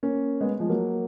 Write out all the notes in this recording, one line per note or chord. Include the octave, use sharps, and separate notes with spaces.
A#3 C#4
G#3 B3
F3 G#3
F#3 A#3